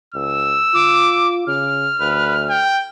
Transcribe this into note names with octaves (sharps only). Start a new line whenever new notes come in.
C#2 E6
F4 D6
C#3 F6
D2 B4
G5